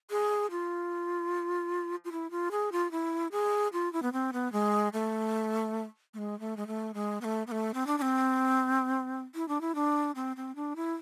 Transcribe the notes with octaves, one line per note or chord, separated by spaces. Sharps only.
G#4
F4
F4
E4
F4
G#4
F4
E4
G#4
F4
E4
B3
C4
B3
G#3
A3
A3
G#3
A3
G#3
A3
G#3
B3
A3
B3
A3
C4
D4
D4
C4
E4
D4
E4
D4
C4
C4
D4
E4